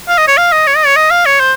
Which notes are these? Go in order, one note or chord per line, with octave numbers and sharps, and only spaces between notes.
F5
D#5
C#5
F5
D#5
C#5
D#5
C#5
D#5
F5
C#5
C5